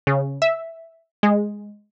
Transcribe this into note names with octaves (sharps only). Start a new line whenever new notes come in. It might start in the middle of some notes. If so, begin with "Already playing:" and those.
C#3
E5
G#3